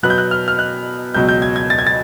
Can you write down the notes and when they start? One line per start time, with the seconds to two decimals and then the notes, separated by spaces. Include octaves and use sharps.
0.03 B2 F#3 B3 F#6
0.10 G6
0.18 F#6
0.31 F6
0.48 F6
0.59 F#6
1.14 C#2 B2 F#3 G6
1.29 G6
1.42 G#6
1.56 G#6
1.70 A6
1.79 G#6
1.87 A6